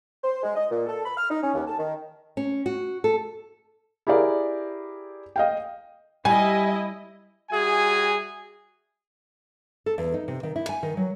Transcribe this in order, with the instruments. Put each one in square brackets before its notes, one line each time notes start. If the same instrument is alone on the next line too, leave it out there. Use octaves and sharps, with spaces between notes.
[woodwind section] C5
G#3
D#5
A#2
A4
B5
F6
D#4
C#4
D#2
A5
D#3
[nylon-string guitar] C#4
F#4
A4
[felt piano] E4 G4 G#4 A#4 D5
D#5 F5 G5
[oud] G3 [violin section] E4 D#5 [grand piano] G#5
[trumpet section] G3 F#4 G#4 E5 G#5
[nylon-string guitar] A4
E2
D#4
C3
D#3
E4
G#5
D#3
F#3